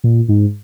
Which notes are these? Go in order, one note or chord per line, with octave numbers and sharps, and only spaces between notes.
A#2
G#2